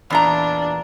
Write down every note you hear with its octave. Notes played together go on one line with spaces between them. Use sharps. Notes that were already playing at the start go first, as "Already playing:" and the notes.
E2 A#2 D4 A#5